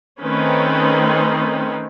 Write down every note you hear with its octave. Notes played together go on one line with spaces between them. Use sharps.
D#3 A3 C4 C#4 B4